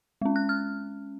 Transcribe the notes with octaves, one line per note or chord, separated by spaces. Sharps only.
G#3 C#4
F#6
F6